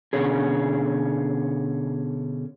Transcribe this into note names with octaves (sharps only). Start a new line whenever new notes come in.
B2 D3 C#4 G#4